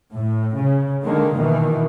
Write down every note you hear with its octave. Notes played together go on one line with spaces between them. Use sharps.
A2
C#3
D3 D#3 G#3 A#3
B2 D#3 E3